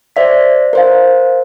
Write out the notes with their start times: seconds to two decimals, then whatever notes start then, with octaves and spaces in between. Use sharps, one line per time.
0.16 C5 D5 E5 B6
0.73 A#4 C5 F5